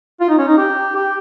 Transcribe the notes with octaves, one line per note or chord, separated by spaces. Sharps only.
F4
D#4
C#4
D#4
G4
G4